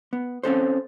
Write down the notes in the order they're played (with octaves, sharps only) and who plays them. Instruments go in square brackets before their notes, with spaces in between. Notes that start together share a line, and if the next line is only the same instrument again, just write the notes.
[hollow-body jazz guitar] B3
C4 C#4 A4 C5